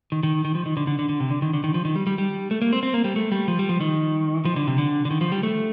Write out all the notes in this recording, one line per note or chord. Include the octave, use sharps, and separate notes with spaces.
D#3
D#3
D#3
F3
D#3
D3
D3
D3
D3
C3
D3
D#3
D3
D#3
F3
D#3
G3
G3
G3
A3
A#3
C4
C4
A#3
G3
A3
G3
F3
G3
F3
D#3
F3
D3
C3
D3
D3
D#3
F3
G3
A3